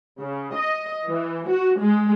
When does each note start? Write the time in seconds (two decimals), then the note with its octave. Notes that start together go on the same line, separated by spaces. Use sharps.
0.21 C#3
0.55 D#5
1.08 E3
1.49 F#4
1.80 G#3